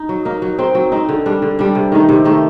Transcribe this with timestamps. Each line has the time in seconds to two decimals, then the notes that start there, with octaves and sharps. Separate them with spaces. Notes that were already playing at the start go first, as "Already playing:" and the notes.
Already playing: D#4
0.09 F#3
0.25 A#3 D#4
0.42 F#3
0.59 C4 D#4
0.75 F#3
0.92 C4 D#4
1.09 D3
1.26 G3 D4
1.42 D3
1.59 G3 D4
1.75 C3
1.92 D#3 A3 D#4
2.09 C3
2.25 D#3 A3 D#4